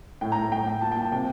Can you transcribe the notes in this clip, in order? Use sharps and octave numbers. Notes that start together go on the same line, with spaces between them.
A2 G5
A#5
A2
A#5
A2 G5
A2 G5
A#2 A5
A#2 G5
A5
C3 G5